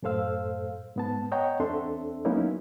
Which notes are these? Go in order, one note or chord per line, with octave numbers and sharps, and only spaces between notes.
F#2 A2 A4 C5 F5 E6
G#2 B3 A5
C#5 D#5 F#5 G5 A#5 C#6
E2 C4 D4 A4 E5 C6
F#3 A#3 B3 C#4 D#4 E4